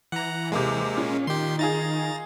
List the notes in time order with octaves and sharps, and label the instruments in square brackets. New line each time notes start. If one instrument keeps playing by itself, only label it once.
[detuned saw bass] E3 [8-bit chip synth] F#5 A#5
[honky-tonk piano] D#2 C3 [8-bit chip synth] G#3 A#3
[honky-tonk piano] A#2 [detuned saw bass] C#4
[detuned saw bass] D#3 [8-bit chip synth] G4 C6
[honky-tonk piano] D#4 F4 G#4 [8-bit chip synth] A#5 A6